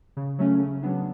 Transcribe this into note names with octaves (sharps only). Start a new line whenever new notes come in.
C#3
F#3 A3 C#4
C#3
F#3 B3 D4